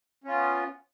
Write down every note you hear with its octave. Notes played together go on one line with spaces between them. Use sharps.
B3 C#4 F4